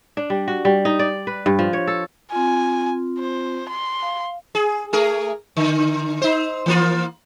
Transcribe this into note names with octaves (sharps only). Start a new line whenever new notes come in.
D4
G3
F#4
G3
D#4
D5
B4
G2
F3
C#5
A4
C4 F4 G#5
C5
C6
F5
G#4
A3 G#4 A#4
D3
D#4 C5
E3 A#3 F4